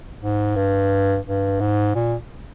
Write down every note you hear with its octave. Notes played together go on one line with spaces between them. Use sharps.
G#2
G2
G2
G#2
A#2